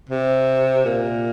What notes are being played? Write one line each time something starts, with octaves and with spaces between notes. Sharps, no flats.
C3
A#2